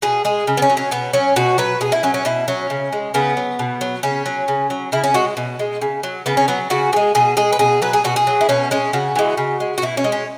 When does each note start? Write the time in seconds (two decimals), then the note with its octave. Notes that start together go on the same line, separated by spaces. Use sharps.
0.02 B2 G#4
0.25 G#3 G#4
0.47 C#3
0.57 B3
0.62 C#4
0.70 F#3
0.77 C#4
0.91 B2 B3
1.13 F#3 C#4
1.36 B2 F#4
1.58 F#3 B4
1.81 B2 G#4
1.92 E4
2.03 F#3 C#4
2.14 C#4
2.25 B2 E4
2.48 F#3 C#4
2.70 C#3
2.93 G#3
3.14 C#3 B3
3.37 F#3
3.59 B2
3.81 F#3
4.03 C#3 C#4
4.26 F#3
4.48 C#3
4.70 F#3
4.92 C#3 E4
5.04 C#4
5.14 G#3 F#4
5.37 B2
5.59 G#3
5.82 C#3
6.03 F#3
6.26 C#3 B3
6.37 C#4
6.48 F#3 B3
6.70 C#3 F#4
6.93 E3 G#3 G#4
7.15 B2 G#4
7.37 G#3 G#4
7.53 B4
7.59 B2 G#4
7.82 F#3 B4
7.93 G#4
8.04 B2 F#4
8.16 G#4
8.27 F#3
8.41 E4
8.49 B2 C#4
8.71 G#3 C#4
8.93 C#3 F#4
9.16 E3 G#3
9.37 C#3
9.60 G#3
9.78 F#4
9.82 B2 E4
9.97 C#4
10.04 G#3
10.12 C#4